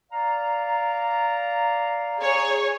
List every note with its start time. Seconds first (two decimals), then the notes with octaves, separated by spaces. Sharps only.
0.12 D5 F5 A#5
2.20 G#4 C#5